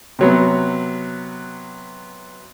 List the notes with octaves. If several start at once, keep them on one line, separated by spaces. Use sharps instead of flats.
C3 F#3 B3